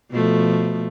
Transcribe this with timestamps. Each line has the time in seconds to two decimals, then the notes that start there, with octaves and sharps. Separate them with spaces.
0.10 B2 F3 A3